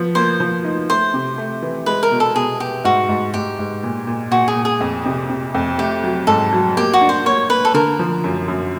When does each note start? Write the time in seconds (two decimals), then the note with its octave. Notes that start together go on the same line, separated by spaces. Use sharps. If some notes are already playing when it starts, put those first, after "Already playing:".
Already playing: F3 B3
0.15 A#3 C5
0.40 F3
0.64 D#4
0.89 A3 C5
1.14 C3
1.38 A3
1.62 E3
1.86 G#3 B4
2.03 A#4
2.11 B2
2.20 A4
2.36 B2 G#4
2.60 B3 G4
2.84 G#2 F#4
3.09 G#2
3.34 G#2 G4
3.59 G#2
3.83 A#2
4.07 A#2
4.31 A#2 F#4
4.48 G#4
4.56 A#2
4.65 G#4
4.80 F2
5.06 C3
5.30 C3
5.54 F2
5.78 A3 G4
6.04 F#3
6.27 G#2 A4
6.52 F#3
6.77 A#3 G4
6.93 F#4
7.01 D4
7.09 C5
7.25 A#3 C#5
7.49 A#3 B4
7.65 A4
7.74 D3 A#4
7.99 F3
8.24 F#2
8.48 F#2